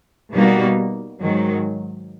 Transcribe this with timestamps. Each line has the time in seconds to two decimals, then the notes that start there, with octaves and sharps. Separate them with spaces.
0.32 B2 G3 A#3 D#4 F#4
1.19 G#2 D#3 F#3